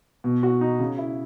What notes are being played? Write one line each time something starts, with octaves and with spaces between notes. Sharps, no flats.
B2
F#4
D#4
C#3
E4